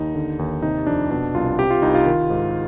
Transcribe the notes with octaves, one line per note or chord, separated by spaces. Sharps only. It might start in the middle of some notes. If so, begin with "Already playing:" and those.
Already playing: D#2 D#4
D3
D#2
C3 D#4
F2 D4
B2 D4
C2 F4
C3 G4
F4
C2 D#4
F4
D#3
G#2